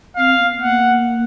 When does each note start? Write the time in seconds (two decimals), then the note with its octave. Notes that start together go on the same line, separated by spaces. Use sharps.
0.16 C4 F5
0.39 B3
0.62 A#3 F#5